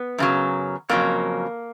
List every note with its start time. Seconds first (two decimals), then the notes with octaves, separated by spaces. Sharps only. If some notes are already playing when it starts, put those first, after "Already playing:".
Already playing: B3
0.18 F#2 C#3 F#3
0.89 F2 C#3 F#3 A#3